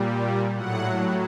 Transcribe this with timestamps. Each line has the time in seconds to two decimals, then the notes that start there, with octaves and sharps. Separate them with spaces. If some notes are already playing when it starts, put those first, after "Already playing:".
Already playing: A#2 G3
0.55 A2 F#3 F#5